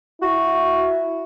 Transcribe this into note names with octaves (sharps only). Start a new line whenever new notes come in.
E4 F#4